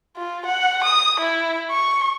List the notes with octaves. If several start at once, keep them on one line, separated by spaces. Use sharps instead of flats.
F4
F#5
D#6
E4
C#6